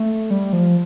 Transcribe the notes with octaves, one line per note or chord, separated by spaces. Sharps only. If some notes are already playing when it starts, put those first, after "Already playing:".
Already playing: A3
G3
F3